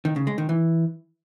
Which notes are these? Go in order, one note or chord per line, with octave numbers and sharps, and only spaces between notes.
D#3
C#3
G#3
D#3
E3